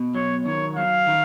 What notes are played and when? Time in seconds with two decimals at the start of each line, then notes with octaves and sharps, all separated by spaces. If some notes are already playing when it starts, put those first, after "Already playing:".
Already playing: B2
0.15 F#3 C#5
0.46 D#3 C#5
0.76 F#3 F5
1.07 D#3